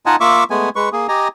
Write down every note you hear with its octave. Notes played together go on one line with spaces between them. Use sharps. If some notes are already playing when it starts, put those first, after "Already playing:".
D#4 F4 D#5 F#5 G#5 A5
A#3 F4 E5 C#6 D6 E6
G#3 A3 B3 G#5
G#3 B4 C#6
A#3 G#4
G4 D#5 G#5 A#5